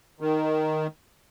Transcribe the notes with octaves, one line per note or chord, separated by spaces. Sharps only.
D#3